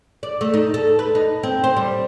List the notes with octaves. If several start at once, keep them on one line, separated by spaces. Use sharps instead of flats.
D5
A3
D#4
A4
B4
D#4
C4
C5
G3